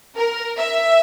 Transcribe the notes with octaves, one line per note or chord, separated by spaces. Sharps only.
A#4
E5